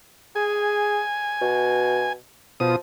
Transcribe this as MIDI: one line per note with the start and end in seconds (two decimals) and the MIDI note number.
0.36 1.01 68
0.36 2.13 80
1.42 2.15 47
2.60 2.76 47
2.60 2.76 53
2.60 2.76 65
2.60 2.76 87